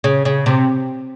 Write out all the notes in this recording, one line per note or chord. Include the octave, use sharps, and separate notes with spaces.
C#3
C#3
C3